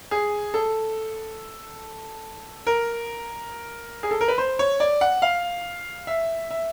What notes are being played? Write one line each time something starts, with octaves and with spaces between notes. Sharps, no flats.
G#4
A4
A#4
G#4
A4
A#4
B4
C5
C#5
D5
F#5
F5
E5
E5